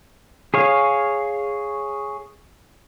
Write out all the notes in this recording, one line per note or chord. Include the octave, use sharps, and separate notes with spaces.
G#4 C#5 F5